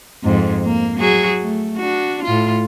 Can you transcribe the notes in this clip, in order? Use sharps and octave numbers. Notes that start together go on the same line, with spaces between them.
F2 G#2
A#3
F#3 F#4 G#4
A3
D4 F#4
A2 A3 F4